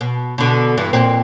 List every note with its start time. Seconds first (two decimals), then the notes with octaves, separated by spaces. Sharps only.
0.01 B2
0.38 B2 D3
0.77 G2 E3
0.93 F2 A#2 C4